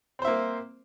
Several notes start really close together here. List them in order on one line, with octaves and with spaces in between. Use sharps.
C4 C5 E5 A#3